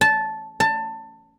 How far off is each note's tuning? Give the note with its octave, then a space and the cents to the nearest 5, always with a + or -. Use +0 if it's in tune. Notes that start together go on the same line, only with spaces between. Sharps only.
A5 -10
A5 +20